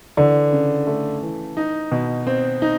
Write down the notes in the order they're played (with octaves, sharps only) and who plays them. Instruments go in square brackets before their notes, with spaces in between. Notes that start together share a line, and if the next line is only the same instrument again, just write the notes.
[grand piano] D3 [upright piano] E3
[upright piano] C#3
A3
E3
D#4
B2
C4
D#4